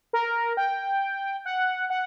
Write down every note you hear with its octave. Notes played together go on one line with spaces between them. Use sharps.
A#4
G5
F#5
F#5